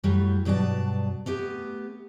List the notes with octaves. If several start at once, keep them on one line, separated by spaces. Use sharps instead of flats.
F#2 A2 F#3 G3 A3
G2 B2 F#3 D5 A5
A3 B3 G4